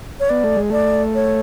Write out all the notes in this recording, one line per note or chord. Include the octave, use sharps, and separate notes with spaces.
C#5
B3 D5
A3
G#3
A3 D5
C#5